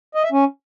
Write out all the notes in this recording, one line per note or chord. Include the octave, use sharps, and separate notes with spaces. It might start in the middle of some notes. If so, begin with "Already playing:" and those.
D#5
E5
C#4